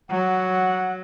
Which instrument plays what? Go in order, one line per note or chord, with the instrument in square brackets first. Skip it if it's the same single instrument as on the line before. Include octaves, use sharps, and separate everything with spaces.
[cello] F#3 [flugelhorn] F#5